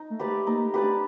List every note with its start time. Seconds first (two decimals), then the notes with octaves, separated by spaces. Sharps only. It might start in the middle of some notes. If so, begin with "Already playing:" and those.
Already playing: D#4
0.10 A3
0.19 G4 B4 D5
0.28 A3
0.46 A#3 D#4
0.65 A3
0.74 G4 B4 D5
0.83 D4